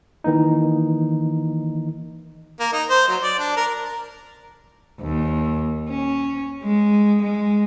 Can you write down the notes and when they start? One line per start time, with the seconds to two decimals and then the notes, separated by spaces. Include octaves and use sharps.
0.24 D#3 E3 A#3 D#4
2.60 A#3
2.73 D#4
2.90 C5
3.08 F#3
3.22 D5
3.39 D4
3.57 A#4
5.01 D#2
5.89 C#4
6.63 G#3
7.22 G#3